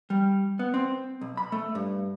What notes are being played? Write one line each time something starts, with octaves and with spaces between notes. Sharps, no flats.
G3
B3
C4
B1
B5
A3
G2